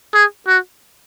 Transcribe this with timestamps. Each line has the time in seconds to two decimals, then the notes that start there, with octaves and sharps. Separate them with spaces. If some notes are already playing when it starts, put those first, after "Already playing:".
0.14 G#4
0.47 F#4